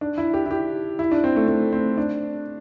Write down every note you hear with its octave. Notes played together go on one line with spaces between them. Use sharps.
D4
E4
G4
E4
G4
E4
D4
C4
A3
A3
C4
D4